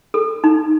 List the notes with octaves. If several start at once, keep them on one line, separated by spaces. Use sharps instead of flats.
A4
D#4